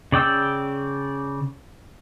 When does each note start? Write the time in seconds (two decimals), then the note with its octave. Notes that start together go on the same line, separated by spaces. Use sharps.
0.12 C#3 D5 G5 E6